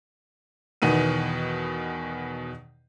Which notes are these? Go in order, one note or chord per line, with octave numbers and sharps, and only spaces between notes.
E2 B2 D#3 B3 D#7